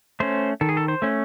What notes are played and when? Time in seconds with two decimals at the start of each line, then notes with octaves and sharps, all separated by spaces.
0.20 A3 C#4 C5
0.61 D#3 A4
0.69 G#4
0.77 A4
0.88 C5
1.02 A3 C#4